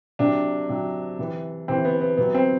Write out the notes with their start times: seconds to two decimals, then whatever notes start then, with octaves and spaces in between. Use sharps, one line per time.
0.19 C3 F#3 D4
0.69 C3 F#3
1.19 C3 E3
1.68 C3 E3 C4
1.85 B3
2.01 B3
2.17 C3 F#3 B3
2.35 C4